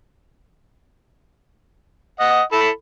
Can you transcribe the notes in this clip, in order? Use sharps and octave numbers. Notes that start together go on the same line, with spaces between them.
D#5 F#5
E4 A4 B5